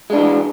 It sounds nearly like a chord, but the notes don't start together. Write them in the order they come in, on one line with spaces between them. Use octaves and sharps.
G#3 D4 E3